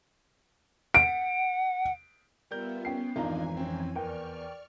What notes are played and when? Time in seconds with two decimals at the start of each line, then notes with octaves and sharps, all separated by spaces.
0.94 F#5 D7
2.51 G3 B3 F4 A#4 E5 G6
2.85 B3 C#4 G5 C7
3.16 G#1 F2 E3 D4 D#4 F4 G#5 A#5
3.57 C4 C#4
3.95 E2 A#4 D5 G5 C#6 F6